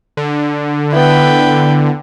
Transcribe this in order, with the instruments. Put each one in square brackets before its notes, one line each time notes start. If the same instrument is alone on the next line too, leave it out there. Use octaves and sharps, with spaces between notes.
[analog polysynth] D3
[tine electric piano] B3 E4 [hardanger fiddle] B4 G5